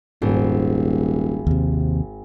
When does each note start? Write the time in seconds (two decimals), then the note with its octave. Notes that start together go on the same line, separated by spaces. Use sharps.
0.22 D#1 G#1
1.47 D#2 C3